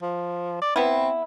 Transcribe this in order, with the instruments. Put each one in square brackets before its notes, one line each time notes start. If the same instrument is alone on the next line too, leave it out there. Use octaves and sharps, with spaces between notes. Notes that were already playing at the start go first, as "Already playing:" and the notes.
[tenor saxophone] F3
D5
[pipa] B3 E4 [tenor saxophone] C4